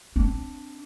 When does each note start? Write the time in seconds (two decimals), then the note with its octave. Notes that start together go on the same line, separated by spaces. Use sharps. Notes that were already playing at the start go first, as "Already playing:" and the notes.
0.16 C4 D4